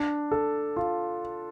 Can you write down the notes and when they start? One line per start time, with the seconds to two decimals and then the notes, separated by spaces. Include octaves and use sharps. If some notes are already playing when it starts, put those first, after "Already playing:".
Already playing: D4
0.31 A4
0.77 F4